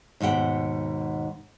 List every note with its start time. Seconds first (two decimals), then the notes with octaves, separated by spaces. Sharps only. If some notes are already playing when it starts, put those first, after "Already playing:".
0.20 D#2 G#2 B2 F#5 G5